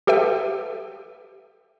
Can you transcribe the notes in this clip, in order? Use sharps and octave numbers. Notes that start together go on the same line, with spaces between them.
G4 A4 B4 E5 G5